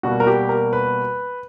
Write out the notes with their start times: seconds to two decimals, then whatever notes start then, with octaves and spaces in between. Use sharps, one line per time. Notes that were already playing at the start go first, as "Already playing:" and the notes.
0.03 B2 G3 A#3 F#4
0.20 A#4
0.27 G4
0.49 A#4
0.73 B4